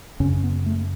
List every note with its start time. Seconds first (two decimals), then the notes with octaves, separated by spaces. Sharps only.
0.20 F#2 C#3 C#4
0.43 B3
0.66 A3